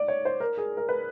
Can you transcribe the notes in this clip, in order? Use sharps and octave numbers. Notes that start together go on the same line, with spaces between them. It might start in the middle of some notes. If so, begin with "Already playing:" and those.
Already playing: D5
C#5
C5
A#4
G#4
A#4
B4